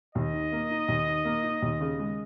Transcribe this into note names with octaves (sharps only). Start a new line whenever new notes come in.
D#2 D#5
D#3
A#3
D#4
D#2
D#3
A#3
D#4
D#2
C#3
G#3